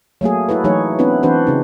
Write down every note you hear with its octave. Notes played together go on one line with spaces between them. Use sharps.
F#3 A3 A#3 G#4
E4 F#4 A4 B4
E3 F#3 A3 D#4 G#4 C#5
B3 C4 D4 E4 B4
E3 C4 D4 F#4 B4 C5
C#3 D#4